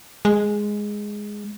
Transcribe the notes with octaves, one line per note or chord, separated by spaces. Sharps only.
G#3